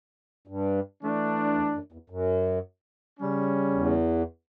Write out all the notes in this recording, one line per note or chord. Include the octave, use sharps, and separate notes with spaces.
G2
E3 A3 D4
E2
F#2
E2
F#2
C#3 G3 C#4
E2